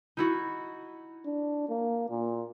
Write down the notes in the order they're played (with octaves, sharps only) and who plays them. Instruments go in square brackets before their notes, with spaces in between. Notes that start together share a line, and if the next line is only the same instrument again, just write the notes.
[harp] D#4 E4 F#4
[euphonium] D4
A#3
A#2